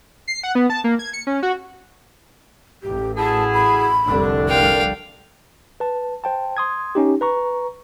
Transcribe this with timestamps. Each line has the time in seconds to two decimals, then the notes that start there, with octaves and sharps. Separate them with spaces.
0.28 C7
0.43 F#5
0.55 B3
0.70 A5
0.84 A#3
0.99 G#6
1.13 C#7
1.27 C#4
1.43 F#4
2.83 A1 G4
3.17 E4 F#4 G#4 A5
3.54 B5
4.07 F1 C2 D3 D4
4.48 A#4 F5 G5
5.80 B4 A5
6.24 C5 G5 A5
6.57 C6 D#6 G#6
6.95 C#4 D#4 G4
7.21 B4 A#5 C#6